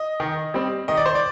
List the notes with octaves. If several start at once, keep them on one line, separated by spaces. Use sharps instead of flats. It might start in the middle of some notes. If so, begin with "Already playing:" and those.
Already playing: D#5
D#3
G3 C4
D#3 D#5
D5
C5
D5